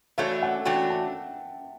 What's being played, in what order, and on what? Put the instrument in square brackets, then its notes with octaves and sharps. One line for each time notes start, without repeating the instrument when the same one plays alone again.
[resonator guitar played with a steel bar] E3 A3 D4 F#4 C#5 [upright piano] E5
[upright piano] F#5
[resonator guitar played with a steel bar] E3 A3 D4 F#4 C#5 [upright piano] G5
[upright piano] A5